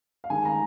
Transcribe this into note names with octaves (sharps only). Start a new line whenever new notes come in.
F5
D#3 G#3 G#5
A#5